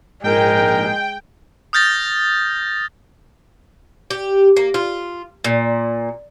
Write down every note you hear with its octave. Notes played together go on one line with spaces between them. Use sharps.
A#1 G#2 G#3 A#4 G5
D#6 F6 G6 A6 A#6
G4
A#3
F4
A#2